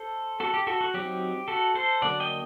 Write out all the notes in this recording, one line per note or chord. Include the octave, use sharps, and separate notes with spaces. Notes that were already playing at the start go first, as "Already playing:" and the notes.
Already playing: A4 C5
F#4 A4
G4
F#4 A4
F#4
F#3 C4 D#4 G4
F#4 A4
A4 C5
D3 F#3 A#3 D4 D5 F#5
D#5 G5